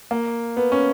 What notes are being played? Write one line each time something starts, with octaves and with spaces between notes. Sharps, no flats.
A#3
B3
C#4